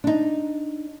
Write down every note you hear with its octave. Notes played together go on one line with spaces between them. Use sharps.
D4 D#4